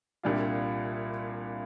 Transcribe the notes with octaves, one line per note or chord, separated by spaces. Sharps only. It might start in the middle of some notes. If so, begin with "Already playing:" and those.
C2 A#2 G3 D4 F4